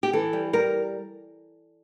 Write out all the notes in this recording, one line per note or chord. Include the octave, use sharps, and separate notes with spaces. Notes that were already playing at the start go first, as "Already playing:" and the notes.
G4
E3 A4
G3
G3 A#4